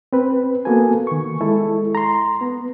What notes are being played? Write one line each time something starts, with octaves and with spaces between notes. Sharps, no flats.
C4 B4
A#3 B3 F#4 A4 G#5
D#3 C#6
G#3 E4 A4
A#5 C6
B3